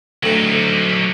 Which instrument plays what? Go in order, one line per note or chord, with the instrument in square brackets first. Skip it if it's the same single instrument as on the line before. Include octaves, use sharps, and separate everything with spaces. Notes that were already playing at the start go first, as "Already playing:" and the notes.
[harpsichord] D2 A2 [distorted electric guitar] F#3 D#4